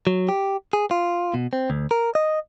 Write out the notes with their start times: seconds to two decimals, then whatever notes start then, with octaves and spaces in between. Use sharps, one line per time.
0.07 F#3
0.29 G4
0.73 G#4
0.91 F4
1.34 B2
1.53 C4
1.70 D2
1.91 A#4
2.15 D#5